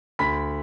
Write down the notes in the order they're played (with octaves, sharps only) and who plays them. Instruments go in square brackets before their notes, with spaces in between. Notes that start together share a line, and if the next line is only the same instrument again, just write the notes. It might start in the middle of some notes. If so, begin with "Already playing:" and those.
[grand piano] D2 B5 B6